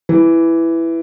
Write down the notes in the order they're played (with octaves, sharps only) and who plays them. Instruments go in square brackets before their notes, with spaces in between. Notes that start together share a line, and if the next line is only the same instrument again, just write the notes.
[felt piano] E3